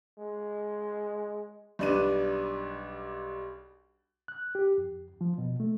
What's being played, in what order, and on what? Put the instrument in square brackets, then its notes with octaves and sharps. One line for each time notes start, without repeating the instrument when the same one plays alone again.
[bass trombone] G#3
[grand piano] B1 G3 D4 B4 D#7
[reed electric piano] F#6
G4
F2
F3
B2
A3